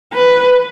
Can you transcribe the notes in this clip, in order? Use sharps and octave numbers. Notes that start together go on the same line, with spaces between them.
B4